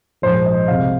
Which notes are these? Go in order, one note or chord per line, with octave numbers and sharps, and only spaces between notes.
A#1 G#2 F3 G#3 C5
D#5
C2 C3 G#3 F5